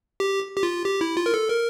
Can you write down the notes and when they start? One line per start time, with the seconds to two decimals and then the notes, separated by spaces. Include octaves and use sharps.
0.20 G4
0.57 G4
0.63 F4
0.85 G4
1.01 E4
1.17 F4
1.26 A#4
1.34 A4
1.50 A#4